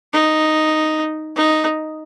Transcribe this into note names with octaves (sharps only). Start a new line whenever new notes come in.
D#4
D#4